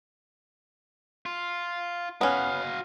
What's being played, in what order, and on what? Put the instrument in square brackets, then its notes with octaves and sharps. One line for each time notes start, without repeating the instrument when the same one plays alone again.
[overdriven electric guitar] F4
[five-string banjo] B3 C#4 [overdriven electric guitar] F#4 F5